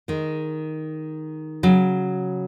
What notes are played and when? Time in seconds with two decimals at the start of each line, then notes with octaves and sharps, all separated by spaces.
0.08 D#3 G#3
1.63 C#3 F#3